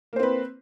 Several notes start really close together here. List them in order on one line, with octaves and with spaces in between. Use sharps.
A#3 C5 C4 B4